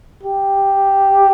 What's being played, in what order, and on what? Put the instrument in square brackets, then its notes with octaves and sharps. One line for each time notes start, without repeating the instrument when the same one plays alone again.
[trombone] G4